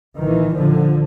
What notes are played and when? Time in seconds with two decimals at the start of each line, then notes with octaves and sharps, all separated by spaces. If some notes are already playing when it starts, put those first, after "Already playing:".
0.18 A#1 D#3 E3
0.54 A#1 D3 F3